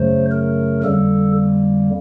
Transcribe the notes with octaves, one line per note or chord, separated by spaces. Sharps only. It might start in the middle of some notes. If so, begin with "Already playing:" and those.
Already playing: F#2 C#3 F#3 A3 C5
A#4
F2 D3 G3 A#3 A4